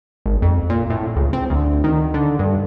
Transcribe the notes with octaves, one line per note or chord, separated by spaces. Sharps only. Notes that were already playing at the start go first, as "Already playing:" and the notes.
G#1
F2
A#2
A2
C#2
C4
D2
D#3
D3
G2